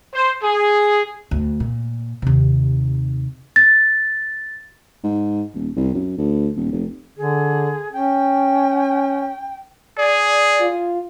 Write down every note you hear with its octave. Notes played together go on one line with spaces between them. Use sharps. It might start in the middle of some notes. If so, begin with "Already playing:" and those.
C5
G#4
D2
A#2
D#2 C3
A6
G#2
D#1
C2
F#2
D2
D#1
F1
D3 G#4
C#4 G5
G#4 D5
F4